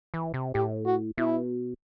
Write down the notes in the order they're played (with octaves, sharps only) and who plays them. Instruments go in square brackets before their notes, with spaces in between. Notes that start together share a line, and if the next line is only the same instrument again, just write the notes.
[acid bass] E3
C3
[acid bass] A2 [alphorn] G4
[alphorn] F#4
[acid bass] B2 [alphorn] E4